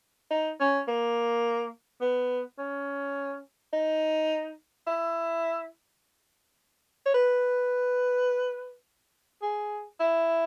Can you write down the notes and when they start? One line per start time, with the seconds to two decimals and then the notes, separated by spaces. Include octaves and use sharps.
0.31 D#4
0.60 C#4
0.88 A#3
2.02 B3
2.59 C#4
3.73 D#4
4.87 E4
7.06 C#5
7.14 B4
9.42 G#4
10.00 E4